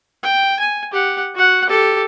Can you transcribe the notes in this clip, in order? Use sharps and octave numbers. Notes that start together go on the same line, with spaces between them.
G5
G#5
G4 F#5
F#4 F#5
G4 A4